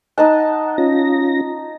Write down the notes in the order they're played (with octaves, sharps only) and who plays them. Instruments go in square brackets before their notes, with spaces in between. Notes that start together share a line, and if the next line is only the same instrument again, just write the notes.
[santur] D#4 D#5 A5 [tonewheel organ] F#5
[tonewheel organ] C#4 F4 A#6